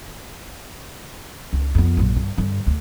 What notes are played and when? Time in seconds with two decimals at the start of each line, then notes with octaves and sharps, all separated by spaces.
1.53 C#2
1.75 F2 B3
1.97 A#1 F#2
2.16 G2 D3
2.37 G2 D3
2.66 D2